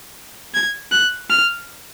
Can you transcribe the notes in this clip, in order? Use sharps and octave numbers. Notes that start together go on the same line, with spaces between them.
G#6
F#6
F6